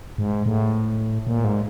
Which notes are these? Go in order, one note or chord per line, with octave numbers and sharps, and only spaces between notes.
G#2
A2
A#2
G#2